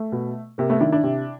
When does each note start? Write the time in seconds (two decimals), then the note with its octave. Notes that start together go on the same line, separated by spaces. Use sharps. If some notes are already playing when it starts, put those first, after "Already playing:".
Already playing: A3
0.12 B2
0.58 C3 A#3
0.69 A3 B3
0.81 D#3 D4 E4
0.92 D4 E4
1.03 C3